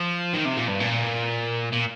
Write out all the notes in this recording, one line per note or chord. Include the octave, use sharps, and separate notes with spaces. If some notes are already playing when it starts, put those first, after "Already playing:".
Already playing: F3
D#3
C3
A#2
G2
A#2
A#2